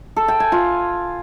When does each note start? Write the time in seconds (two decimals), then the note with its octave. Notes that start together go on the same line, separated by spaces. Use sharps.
0.16 A4
0.28 G5
0.40 G#5
0.52 F4